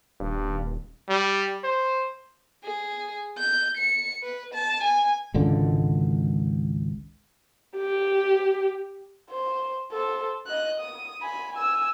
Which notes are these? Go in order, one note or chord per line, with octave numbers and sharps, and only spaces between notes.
D#1 G2
G3
C5
G#4
G6
C#7
B4
A5
G#5
G#1 C#2 D3
G4
C5
A4 C5
D#5 F#6
D#6
G#5 B5
G#5 E6